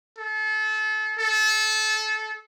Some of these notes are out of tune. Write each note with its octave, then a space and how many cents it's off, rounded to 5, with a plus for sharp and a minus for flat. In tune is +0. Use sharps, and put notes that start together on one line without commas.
A4 -35
A4 -25